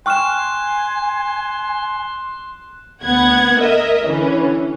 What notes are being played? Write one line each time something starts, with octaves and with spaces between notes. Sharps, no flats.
G5 G#5 C6 C#6 F6 F#6 E7
D2 B3 F#5 G#6
A#4 D#5 E5
D3 E3 C#4